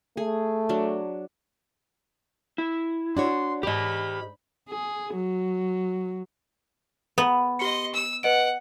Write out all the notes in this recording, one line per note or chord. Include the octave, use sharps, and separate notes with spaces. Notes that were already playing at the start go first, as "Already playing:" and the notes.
A3 G#4
F#3 D4
E4
D4 F#4 C#5 C6
D2 G#2 G4 D#5 B5
G#4
F#3
B3
G4 D#5 C6 C#7
E6
B4 D#5 F#5 D7